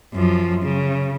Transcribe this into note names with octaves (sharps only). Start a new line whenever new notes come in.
F#2 F3
C#3